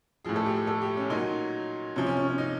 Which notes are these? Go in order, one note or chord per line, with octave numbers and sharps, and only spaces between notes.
A2 F3 G#4
A4
G4
A4
G4
C#4
A#2 F#3 D#4
C3 F3 C#4
C#4
C#4
C#4
D#4